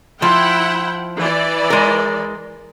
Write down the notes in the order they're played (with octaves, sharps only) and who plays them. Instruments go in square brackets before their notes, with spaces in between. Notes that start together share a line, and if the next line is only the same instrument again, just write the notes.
[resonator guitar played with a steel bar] F3 [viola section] E4 F#5 G5
[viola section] E3 D5
[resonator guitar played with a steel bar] G#3 A#4